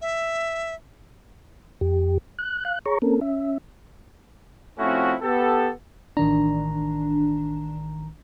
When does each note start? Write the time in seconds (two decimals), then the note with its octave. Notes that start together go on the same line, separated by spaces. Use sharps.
0.01 E5
1.81 F2 G4
2.39 F#6
2.65 F5 F#6
2.86 G#4 C#5 A#5 C#6
3.02 A#3 C4 C#4 A4 A#4
3.21 C#4 E5
4.79 F3 A3 C4 C#4 E4 F#4
5.21 B3 G4 A4
6.17 A1 D#3 D4 A#5